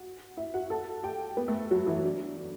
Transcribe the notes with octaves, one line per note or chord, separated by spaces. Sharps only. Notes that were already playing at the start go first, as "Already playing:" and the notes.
Already playing: F#4 F#5
E4 E5
F#4 F#5
A4 A5
G4 G5
B3 B4
A3 A4
F#3 F#4
E3 E4
D4
D4